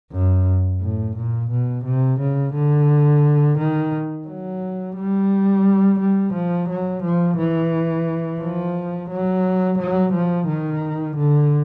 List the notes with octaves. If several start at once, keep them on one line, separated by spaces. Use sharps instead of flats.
F#2
A2
A#2
B2
C3
C#3
D3
D#3
F#3
G3
G3
F3
F#3
F3
E3
F3
F#3
F#3
F3
D#3
D3